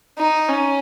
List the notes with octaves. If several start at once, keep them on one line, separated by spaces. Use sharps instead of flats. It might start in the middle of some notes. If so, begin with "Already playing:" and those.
D#4
C#4